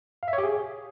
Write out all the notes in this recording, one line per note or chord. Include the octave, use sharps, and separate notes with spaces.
F5
E5
C#5
G4
G#4